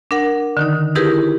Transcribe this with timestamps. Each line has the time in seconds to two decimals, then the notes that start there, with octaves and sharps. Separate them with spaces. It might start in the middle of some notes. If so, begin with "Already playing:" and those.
0.11 D4 A#4 F#5
0.57 D3 D#3 D#4
0.95 D#4 E4 G4 G#4 A#4 B4